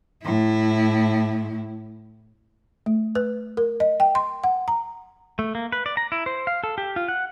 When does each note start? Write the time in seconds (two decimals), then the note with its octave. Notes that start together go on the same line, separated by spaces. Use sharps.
0.23 A2 E4
2.86 A3
3.15 B4
3.57 A#4
3.80 D#5
4.00 G5
4.15 C6
4.44 F#5
4.68 A#5
5.39 A3
5.55 A#3
5.72 B4
5.86 D5
5.97 A#5
6.12 E4
6.26 C5
6.47 F5
6.64 A4
6.78 G4
6.96 F4
7.08 F#5